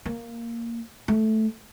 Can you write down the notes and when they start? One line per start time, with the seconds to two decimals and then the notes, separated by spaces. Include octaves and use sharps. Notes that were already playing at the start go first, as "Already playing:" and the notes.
0.05 A#3
1.08 A3